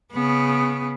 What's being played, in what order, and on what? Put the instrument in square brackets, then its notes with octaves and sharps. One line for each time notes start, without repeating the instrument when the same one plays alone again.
[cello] C#3 B3